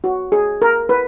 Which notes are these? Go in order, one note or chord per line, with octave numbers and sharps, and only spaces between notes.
F#4
G#4
A#4
B4